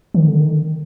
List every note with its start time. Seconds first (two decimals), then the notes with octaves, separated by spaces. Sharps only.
0.14 D#3
0.28 D3
0.41 D#3